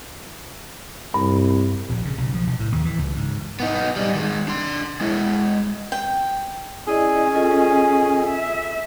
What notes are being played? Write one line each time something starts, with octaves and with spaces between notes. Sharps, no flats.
C2 G2
A#1
C#3
B1
F3
B1
A2
D#2
E3
C#2
G#2
B3 D#4
G3 D#4
D#3 G#3
D4 C6
G#3 E4
G5
C#4 E4 G#4 D5 D#5
F4 A4 D#5
E5